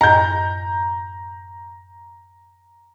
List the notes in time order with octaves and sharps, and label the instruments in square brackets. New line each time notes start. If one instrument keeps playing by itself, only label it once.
[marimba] F#2 A2 D#5 [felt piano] A#5 G6